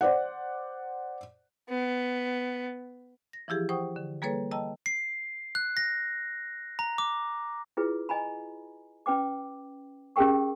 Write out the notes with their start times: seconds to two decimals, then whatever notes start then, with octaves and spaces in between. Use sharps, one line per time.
0.01 C5 D5 F#5
1.69 B3
3.33 A#6
3.48 E3 F3 E4 G4 G#4
3.69 C5 F#5 G5 C#6 D#6
3.96 D3
4.22 G3 A#3 G#4 A4 B4 C#5
4.51 D#5 G5 A5 A#5 E6
4.86 C7
5.55 F#6
5.77 A#6
6.79 A#5
6.98 D6
7.77 E4 F4 G#4 B4
8.09 D#5 G#5 A#5 B5
9.06 C#4 B4 G5 D6
10.16 C#4 G4 G#4 A#4 G5 C#6